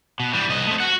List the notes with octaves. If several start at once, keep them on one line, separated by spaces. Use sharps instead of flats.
B2
E3 G3
C2 D#5
A3 C4
F#4 F#5